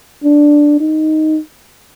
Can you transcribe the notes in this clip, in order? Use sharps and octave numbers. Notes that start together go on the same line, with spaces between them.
D4
D#4